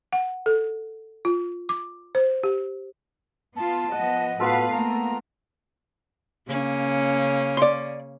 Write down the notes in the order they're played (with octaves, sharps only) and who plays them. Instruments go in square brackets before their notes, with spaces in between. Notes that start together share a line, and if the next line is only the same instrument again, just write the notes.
[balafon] F#5
A4
F4
D6
C5
G4
[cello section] B3 F4 [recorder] A5
[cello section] F3 B3 D#5 [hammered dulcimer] F#5
[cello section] A2 B4 F5 [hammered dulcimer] B3 F4 A4 [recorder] F#4
[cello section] A3 A#3 [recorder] A#5
[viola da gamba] C#3 A#3 C#4
[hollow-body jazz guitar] D5 C6